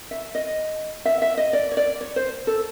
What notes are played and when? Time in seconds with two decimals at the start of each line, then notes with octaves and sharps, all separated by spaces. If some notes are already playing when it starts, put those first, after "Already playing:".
0.11 E5
0.35 D#5
1.05 E5
1.22 E5
1.37 D#5
1.53 D5
1.72 C#5
1.77 D5
2.01 C#5
2.16 C5
2.47 A4